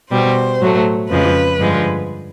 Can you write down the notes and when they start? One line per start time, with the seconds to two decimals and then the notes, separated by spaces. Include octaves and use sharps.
0.11 B2 G3 C5
0.60 A2 F#3 A3
1.09 F2 C#3 F3 G#3 B4
1.59 G2 D3 F3 G#3